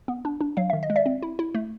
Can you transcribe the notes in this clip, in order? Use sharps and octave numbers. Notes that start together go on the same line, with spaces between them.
B3
D4
D4
F#3 F5
D#3 E5
D#5
G#3
D5 E5
C4
E4
E4
A3